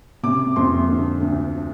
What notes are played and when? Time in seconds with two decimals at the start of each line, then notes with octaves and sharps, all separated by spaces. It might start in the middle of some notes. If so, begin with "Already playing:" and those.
0.23 C3 D6
0.56 F2 C6
0.89 D3
1.21 D2